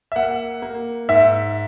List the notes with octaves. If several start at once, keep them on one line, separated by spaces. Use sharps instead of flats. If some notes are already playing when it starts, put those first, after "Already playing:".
E5
A#3 F#5
A#3
G#2 E5